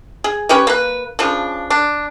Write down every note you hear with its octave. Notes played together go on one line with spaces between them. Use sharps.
G#4
C#4 G4 B4 C#5
A#3 B4
C#3 F3 D4
D4